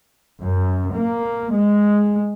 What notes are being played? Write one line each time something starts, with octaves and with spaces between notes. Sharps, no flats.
F#2
A#3
G#3